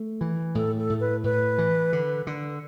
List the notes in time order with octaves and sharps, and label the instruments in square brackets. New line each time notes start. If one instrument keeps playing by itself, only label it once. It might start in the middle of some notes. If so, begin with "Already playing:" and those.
Already playing: [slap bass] A3
E3
[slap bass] A2 [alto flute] A4
[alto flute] A4
[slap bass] A2
[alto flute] B4
[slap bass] A2 [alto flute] B4
[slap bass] E3
D3
D3